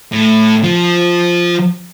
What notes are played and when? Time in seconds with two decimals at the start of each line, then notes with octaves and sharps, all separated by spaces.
0.12 A2
0.64 F3